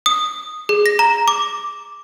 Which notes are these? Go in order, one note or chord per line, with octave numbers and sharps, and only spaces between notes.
D#6
G#4
A#6
A#5
D6